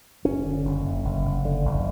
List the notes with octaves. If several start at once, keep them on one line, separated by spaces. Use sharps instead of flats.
F#1 C#4
D3
F#1
F#1
F#1
F#1
D3
F#1